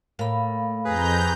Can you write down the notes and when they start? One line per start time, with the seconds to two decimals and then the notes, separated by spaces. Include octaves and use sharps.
0.19 A2 A#3 F5 B5
0.85 F2 G#4 B4 A#5 G6